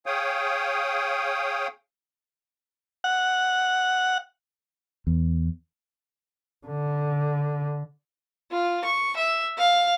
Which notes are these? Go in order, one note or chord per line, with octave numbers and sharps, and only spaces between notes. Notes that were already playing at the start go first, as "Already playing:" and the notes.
G#4 C#5 F5 G5 D#6
F#5
E2
D3
F4
C#6
E5
F5